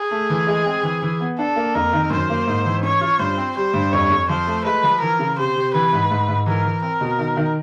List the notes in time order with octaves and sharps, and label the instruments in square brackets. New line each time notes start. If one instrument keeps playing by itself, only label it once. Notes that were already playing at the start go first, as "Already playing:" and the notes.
Already playing: [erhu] G#4
[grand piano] A3
E3
G#3
C4
E3
E3
B3
[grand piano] D4 [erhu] A4
[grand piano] A#3
[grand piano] F2 [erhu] A#4
[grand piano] D#3
[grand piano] F#2 [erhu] C5
[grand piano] A#3
G#2
E3
[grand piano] C#4 [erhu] C#5
[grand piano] F4
[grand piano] G2 [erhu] C5
[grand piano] C4
[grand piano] G3 [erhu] C5
[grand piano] G2
[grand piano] F2 [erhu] C#5
[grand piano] F2
[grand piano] F3 [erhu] C5
[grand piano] A3
[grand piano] G#3 [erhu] B4
[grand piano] F3
[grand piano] E3 [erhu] A#4
[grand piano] C#3
[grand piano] C3 [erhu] C5
[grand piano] C3
[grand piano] E3 [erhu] B4
[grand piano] G#2
G#2
G#2
[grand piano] E3 [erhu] A#4
[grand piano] E3
[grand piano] C4 [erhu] A#4
[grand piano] B2
D#3
D#3